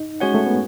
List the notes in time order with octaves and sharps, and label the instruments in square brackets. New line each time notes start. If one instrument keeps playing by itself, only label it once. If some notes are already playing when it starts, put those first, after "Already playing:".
Already playing: [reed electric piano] D#4
[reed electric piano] G#3 [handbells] C#4 F#4 C#5 F#5
[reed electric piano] A3
B3